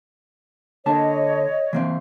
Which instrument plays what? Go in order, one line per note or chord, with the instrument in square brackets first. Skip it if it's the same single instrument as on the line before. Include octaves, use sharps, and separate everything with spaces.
[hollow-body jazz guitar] D3 A#3 A5 [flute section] C#5 D#5
[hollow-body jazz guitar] E3 A#3 C4